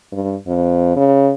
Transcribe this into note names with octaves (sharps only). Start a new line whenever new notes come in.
G2
F2
C#3